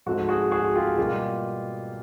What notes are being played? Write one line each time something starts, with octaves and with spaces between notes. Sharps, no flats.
G#2 F3 A3 C4 F#4
F#4 G#4
F#4 G#4
F4 G4
B2 G3 A#3 F4 G4